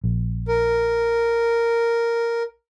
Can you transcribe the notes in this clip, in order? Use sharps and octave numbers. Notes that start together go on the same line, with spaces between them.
A#1
A#4